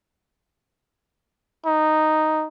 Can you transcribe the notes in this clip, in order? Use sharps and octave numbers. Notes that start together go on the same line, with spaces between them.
D#4